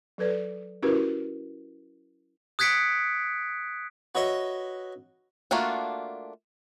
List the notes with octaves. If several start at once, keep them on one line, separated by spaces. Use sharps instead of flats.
F#3 A4 B4 D5
C#4 E4 F#4 G4 A#4 B4
D#6 F#6 G#6 B6 C#7 D7
F#4 B4 C#5 D#5 E5
A3 A#3 D4 F4 F#4